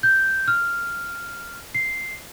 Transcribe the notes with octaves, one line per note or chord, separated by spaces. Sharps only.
G6
F6
C7